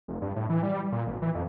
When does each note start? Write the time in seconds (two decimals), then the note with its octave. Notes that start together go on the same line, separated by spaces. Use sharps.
0.08 F1
0.22 G2
0.36 A2
0.50 E3
0.63 G3
0.92 A#2
1.07 G#1
1.22 E3
1.34 F2